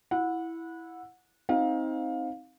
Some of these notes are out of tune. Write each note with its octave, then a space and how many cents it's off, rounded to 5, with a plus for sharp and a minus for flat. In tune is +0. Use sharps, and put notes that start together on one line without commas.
E4 +0 F#5 -20
C4 +15 D#4 +25 F5 +25